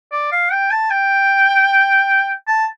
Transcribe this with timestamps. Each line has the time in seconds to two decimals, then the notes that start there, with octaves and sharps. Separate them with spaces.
0.12 D5
0.32 F5
0.52 G5
0.71 A5
0.90 G5
2.47 A5